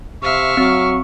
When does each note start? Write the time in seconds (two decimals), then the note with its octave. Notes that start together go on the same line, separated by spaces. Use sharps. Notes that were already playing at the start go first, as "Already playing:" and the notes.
0.23 C3 E5 F5 C#6
0.57 F#3 C4